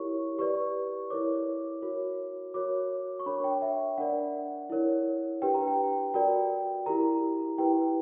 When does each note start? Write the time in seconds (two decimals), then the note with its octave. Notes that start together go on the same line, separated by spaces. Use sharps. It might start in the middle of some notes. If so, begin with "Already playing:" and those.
Already playing: E4 G4 A#4 C#5 C#6
0.38 G4 B4 D5 C#6
1.10 E4 A#4 C#5 D6
1.82 F#4 A#4 C#5
2.54 F#4 A#4 C#5 D6
3.20 C#6
3.26 D4 A#4 C#5 B5
3.44 G5
3.62 E5
3.98 D4 A#4 D5 F#5
4.70 E4 A#4 C#5
5.42 D4 G4 B4 G5
5.54 A#5
5.67 G5
6.14 F#4 A#4 D5 G5
6.86 E4 G4 A#4 A#5
7.58 E4 G4 B4 G5